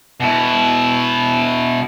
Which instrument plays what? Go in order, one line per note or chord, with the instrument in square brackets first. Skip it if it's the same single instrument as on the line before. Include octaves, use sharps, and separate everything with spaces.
[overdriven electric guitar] B2 E4